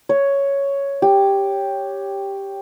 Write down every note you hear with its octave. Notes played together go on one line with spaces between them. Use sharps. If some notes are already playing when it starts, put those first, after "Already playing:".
C#5
G4